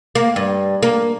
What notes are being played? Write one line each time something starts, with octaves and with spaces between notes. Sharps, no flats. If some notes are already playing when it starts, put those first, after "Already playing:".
A#3
G2
A#3